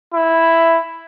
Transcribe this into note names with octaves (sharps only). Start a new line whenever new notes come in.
E4